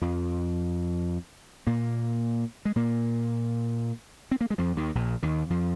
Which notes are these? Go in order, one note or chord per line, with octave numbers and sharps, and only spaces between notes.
F2 F3
A#2 A#3
G#3
A#2 A#3
C4
A#3
G#3
F2 F3
D#2 D#3
A#1 A#2
D#2 D#3
F2 F3